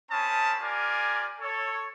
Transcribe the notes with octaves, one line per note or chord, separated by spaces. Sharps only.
C4 C#4 A#4 A5 B5 D#6
F4 G4 A#4 D5 G#5
A4 C#5